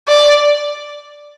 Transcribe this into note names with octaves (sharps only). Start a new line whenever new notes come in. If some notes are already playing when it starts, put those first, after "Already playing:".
D5